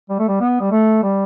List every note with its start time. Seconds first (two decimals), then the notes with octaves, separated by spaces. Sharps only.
0.10 G3
0.19 A3
0.28 G3
0.40 B3
0.61 G3
0.71 A3
1.03 G3